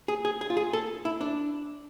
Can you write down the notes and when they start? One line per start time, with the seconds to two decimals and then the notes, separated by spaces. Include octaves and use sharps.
0.08 G#4
0.25 G#4
0.41 G#4
0.50 F4
0.57 G#4
0.73 A4
1.05 E4
1.21 D4